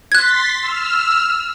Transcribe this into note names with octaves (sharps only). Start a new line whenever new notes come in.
C6 F#6 G#6 A6 B6
E6 F6